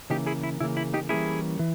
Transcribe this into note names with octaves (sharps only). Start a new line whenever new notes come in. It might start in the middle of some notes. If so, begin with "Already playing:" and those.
C#3 E3 A#3 D#4 G4
E4 G#4
E4
C#3 E3 A#3 E4
E4
D#4 G4
E3 G3 A#3 C#4 E4 G#4
E3